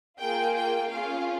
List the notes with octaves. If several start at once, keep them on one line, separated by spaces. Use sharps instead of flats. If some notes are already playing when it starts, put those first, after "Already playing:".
A#3 F4 G#4 G5
G5
C#4 F4 G#4 F5